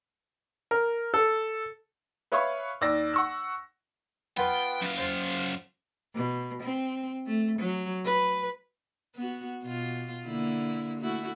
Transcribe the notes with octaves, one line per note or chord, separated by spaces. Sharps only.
A#4
A4
B4 C#5 E5 F5 B5 C#6
D#2 D5 E6 A#6
F#5 C#6 E6
B3 F4 B4 G5
F#2 F5
F4 C5
B2
C4
A3
F#3
B4
B3 F#4
B2 F4
D3 A#3 E4
A3 E4 F#4